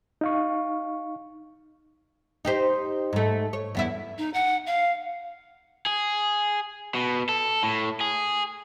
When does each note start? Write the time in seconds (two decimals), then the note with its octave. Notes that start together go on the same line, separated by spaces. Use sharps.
0.21 D#4 F5 C#6
2.45 D#4 G4 C5
3.13 G#2 A3
3.53 C#5
3.75 E2 B3 E4
4.18 D#4
4.34 F#5
4.66 F5
5.86 G#4
6.95 B2
7.29 A4
7.63 A2
8.01 G#4